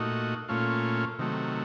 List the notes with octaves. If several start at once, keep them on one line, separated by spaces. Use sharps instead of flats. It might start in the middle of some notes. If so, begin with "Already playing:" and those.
Already playing: A#2 A3 D#4 F#4
A#2 A3 C#4 F4
C3 D#3 F#3 A3